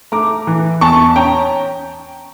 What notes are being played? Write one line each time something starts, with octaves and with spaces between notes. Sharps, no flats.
A3 A#5 D6
E3
E2 A5 C#6
C#4 G5 A#5